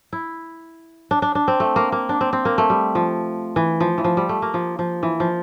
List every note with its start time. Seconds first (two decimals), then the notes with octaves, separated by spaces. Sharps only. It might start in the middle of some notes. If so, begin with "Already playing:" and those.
0.13 E4
1.11 D4
1.22 D4
1.35 D4
1.48 C4
1.60 A3
1.76 A#3
1.92 A#3
2.09 D4
2.21 C4
2.33 C4
2.45 A#3
2.58 A3
2.70 G3
2.95 F3
3.56 E3
3.80 F3
3.98 E3
4.04 F3
4.17 G3
4.29 A3
4.42 A#3
4.54 F3
4.79 F3
5.03 E3
5.20 F3